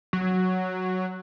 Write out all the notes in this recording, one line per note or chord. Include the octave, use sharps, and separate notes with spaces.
F#3